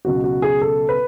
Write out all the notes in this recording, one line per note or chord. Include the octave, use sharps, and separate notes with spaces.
C#2 B2 F#3 F#4
F#4
G#4
A4
B4